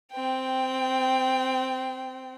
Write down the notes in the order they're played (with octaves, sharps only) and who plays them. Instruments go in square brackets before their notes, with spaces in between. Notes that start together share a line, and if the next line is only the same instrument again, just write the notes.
[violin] C4 G5